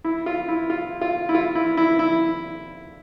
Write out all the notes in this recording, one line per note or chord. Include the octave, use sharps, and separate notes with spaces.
E4
F4
E4
F4
F4
E4
F4
E4
E4
E4